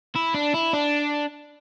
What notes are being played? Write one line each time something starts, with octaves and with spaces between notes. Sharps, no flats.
E4
D4
E4
D4